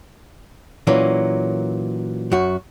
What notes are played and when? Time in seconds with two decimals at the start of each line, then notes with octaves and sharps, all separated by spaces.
0.87 A#2 E3 F#3 A#3 C#4
2.32 F#2 F#4